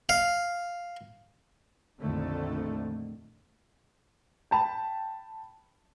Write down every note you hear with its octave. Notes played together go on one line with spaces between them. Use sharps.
F5
A#1 F2 A#2 D3 D#3 A3
G5 A5 B5